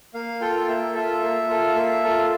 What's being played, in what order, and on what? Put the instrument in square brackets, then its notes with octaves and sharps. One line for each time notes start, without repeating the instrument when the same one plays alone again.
[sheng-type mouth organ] A#3 F5
F4 A4 G5
A#3 E5
F4 A4 E5
A#3
F4 A4
A#3
F4 A4